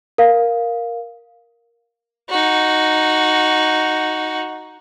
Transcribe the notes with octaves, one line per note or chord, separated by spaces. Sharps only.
A#4 F5
D#4 F#4